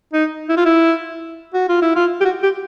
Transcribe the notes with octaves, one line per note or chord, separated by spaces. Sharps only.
D#4
E4
F4
E4
F#4
F4
E4
F4
G4
F#4
G4